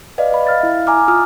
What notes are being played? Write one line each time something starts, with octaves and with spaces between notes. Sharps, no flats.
B4 D5 D#5 F5
D#5 B5
F5 F6 A6
E4 E5
G#5 A#5 D6 F6
F4 D#6 F6